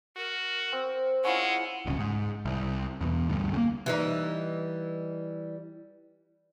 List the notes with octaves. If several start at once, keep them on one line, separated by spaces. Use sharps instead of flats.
F#4 A#4
C4
G#3 C#4 E4 F4 F#5
D1 C2 C#3
G#2
C2
E2 B2
D2 G2
C#3 A#3
E3 G3 D#4